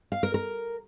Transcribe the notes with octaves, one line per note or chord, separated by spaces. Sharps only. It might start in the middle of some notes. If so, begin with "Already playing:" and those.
F5
A#4
A#4